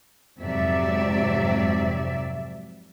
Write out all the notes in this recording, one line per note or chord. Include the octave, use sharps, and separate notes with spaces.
F2 G#2 C3 F#3 D5 E5